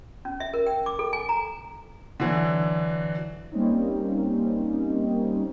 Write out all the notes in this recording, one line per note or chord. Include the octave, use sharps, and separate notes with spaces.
C#4
E5
A#4
G5
D6
A4
G#5
A#5
D3 E3 F#3
G3 A#3 C4 C#4 D#4